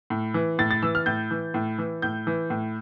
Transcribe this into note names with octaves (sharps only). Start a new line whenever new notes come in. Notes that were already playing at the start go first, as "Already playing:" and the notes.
A2
E3
A2 A6
A6
E3 E6
F6
A2 G6
E3
A2
E3
A2 G6
E3
A2